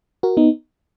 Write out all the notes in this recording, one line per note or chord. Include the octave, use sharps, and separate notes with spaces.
F#4 A#4
B3 D#4